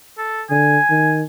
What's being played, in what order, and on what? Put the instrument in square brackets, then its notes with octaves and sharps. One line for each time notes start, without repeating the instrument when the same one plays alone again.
[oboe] A4
[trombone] D3 [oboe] G#5
[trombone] D#3